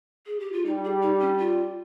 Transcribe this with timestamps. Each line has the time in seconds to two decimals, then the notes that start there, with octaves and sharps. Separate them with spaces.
0.26 G#4
0.40 G4
0.53 F4
0.65 G3 D#4
0.84 G#4
1.02 D#4
1.21 C#4
1.39 F4